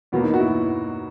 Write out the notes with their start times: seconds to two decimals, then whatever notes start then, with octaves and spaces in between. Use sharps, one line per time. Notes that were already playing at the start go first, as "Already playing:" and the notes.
0.12 E2 B2 F#3 A#3 B3
0.23 D#4
0.34 F#4
0.40 E4